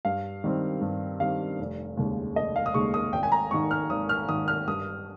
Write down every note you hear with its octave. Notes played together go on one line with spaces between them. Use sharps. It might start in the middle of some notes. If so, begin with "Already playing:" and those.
G2 F5
D#3 G3 C4
G2
D#3 G3 C4 F5
F1
D#2 C#3 G#3
F1 D#5
F5
D#6
D#2 C#3 G#3 C#6
D#6
G#1 G5
G#5
A#5
G#2 D#3 C#6
F6
G#1 D#6
F6
G#2 D#3 D#6
F6
G2 D#6